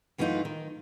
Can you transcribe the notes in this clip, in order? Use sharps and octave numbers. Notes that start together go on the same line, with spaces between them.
F#2 E3 A3 C#4 D#4 F4
D#3